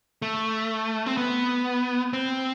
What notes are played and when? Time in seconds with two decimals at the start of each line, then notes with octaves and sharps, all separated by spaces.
0.22 A3
1.06 C4
1.17 B3
2.13 C4